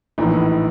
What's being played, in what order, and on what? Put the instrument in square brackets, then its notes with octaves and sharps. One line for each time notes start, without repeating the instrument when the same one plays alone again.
[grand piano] A#1 A2 E3 D#4